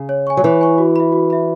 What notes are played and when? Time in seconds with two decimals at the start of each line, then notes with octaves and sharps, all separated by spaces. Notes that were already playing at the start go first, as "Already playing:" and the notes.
Already playing: C#3
0.09 C#5
0.27 G#5 C#6
0.37 F#3
0.44 E3 C#5
0.61 G#5 C#6
0.78 F#4
0.96 E5 B5
1.12 F#4
1.30 E5 B5